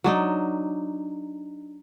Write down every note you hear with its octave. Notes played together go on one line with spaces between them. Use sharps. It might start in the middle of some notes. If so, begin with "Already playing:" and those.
F#3 D4 D#4